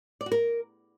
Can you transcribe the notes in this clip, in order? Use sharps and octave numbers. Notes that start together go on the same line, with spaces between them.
D5
F#4
A#4